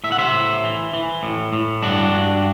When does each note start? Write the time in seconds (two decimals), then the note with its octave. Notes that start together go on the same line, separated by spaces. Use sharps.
0.04 A2 E5
0.12 F#5
0.18 C5 E5
0.34 A2
0.64 E3
0.93 E3
1.23 A2
1.53 A2
1.83 G2 D4 F#4
2.13 G2